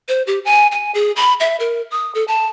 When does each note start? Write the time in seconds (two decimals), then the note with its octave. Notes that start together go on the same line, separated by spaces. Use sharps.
0.08 C5
0.27 G4
0.45 G#5
0.72 G#5
0.95 G#4
1.16 B5
1.40 E5
1.60 A#4
1.91 D#6
2.15 A4
2.28 A5